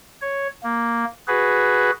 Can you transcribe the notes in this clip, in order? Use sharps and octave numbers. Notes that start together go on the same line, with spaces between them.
C#5
A#3
F#4 G#4 B4